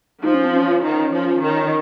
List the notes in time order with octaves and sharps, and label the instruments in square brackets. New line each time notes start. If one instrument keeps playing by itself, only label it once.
[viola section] F3 [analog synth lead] D#4
[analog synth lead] C#4
C4
C#4
[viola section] D#3
F3
D#3